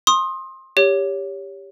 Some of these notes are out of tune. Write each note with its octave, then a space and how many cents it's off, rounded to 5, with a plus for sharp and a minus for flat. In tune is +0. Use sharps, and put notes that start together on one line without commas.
C6 +25 D#6 +0
G4 +15 C#5 +15